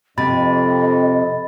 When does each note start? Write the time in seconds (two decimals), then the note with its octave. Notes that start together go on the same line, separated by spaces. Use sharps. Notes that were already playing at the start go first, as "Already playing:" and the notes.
0.18 F2 C3 D#5 B5 A6